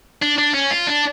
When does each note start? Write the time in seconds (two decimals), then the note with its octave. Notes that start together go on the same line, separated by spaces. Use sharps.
0.22 D4
0.38 D4
0.54 C#4
0.71 F4
0.87 D4